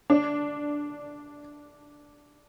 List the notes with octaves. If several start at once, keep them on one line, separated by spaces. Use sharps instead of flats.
D4